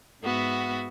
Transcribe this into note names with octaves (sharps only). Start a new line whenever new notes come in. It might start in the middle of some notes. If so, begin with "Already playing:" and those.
G#2 B3 F#4 E5